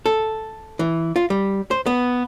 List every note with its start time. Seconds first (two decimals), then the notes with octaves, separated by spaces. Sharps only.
0.06 A4
0.79 E3
1.16 F4
1.30 G3
1.71 C5
1.86 B3